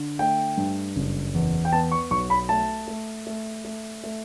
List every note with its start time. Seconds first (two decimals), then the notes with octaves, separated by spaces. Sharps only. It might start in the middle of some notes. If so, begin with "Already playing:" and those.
Already playing: D3
0.19 A3 G5
0.58 G2
0.96 F#1
1.34 E2
1.65 G5
1.72 B3 A5
1.92 C#6
2.11 B1 C#6
2.30 B5
2.49 A3 A5
2.88 A3
3.27 A3
3.65 A3
4.04 A3